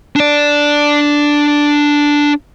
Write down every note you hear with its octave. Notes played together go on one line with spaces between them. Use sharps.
D4 D5